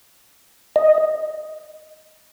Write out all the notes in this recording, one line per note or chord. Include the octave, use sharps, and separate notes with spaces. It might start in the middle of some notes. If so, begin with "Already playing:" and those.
D#5